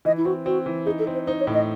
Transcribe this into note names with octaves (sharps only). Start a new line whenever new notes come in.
E3 D#5
E4
C4 F#4
C4 F#4
E3
D#4 G#4
A4
C4
C5
D#4 C5
C#5
A2
D#5